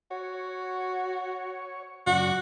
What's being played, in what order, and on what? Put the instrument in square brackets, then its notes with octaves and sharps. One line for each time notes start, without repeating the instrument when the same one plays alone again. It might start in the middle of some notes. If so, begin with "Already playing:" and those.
[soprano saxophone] F#4 [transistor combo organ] C#5
[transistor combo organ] F#2 C#3 D5 [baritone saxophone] F#4